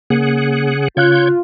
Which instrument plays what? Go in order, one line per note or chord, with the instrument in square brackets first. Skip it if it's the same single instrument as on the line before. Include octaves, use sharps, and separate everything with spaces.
[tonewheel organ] C#3 G#4 F#5 [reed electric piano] A#3
[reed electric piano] C#3 F5 F#6 [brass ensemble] F4 [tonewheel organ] C#5 G6